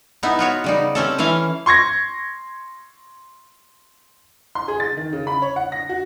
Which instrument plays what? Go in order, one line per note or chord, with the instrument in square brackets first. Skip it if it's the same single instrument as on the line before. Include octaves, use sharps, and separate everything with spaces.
[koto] B3 D#4 E4
F4 F#4 C#5
C#3 G3 D#4
C4 C#4 A4
E3 C#4 E4 F5
[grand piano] C6 C#6 G#6 A#6
[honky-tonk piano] C6
G#4
A6
D#3
C#3
B5
C#5
F#5
A#6
F#4